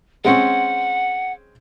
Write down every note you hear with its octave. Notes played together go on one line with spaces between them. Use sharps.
G#3 C4 C#4 F#5